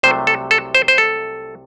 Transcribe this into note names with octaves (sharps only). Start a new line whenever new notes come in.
C2 C3 F#3 A3 C5
A4
A4
C5
C5
A4